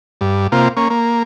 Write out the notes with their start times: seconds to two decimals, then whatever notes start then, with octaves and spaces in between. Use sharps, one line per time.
0.21 G2
0.52 C3 A#3 F4
0.77 A#3 C#4
0.90 A#3